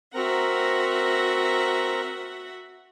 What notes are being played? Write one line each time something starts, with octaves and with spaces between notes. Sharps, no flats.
C4 F#4 A#4 E5 F#5 A#5